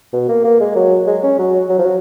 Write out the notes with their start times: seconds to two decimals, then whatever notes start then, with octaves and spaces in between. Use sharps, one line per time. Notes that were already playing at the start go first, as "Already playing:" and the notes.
0.13 B2
0.29 A#3
0.44 A#3
0.60 G#3
0.75 F#3
1.07 G#3
1.23 C#4
1.38 F#3
1.69 F#3
1.79 F3
1.85 F#3